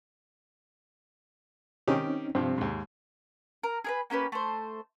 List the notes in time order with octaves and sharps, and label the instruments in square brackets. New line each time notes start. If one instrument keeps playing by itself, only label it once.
[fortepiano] D#3 G4 [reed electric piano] C4 C#4 D#4
[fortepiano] G2 C3 F3 [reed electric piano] C4
[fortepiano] D#2 G#2
[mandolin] A#4
G#4 A#4 B4
A#3 C#4 G4 B4
A3 C5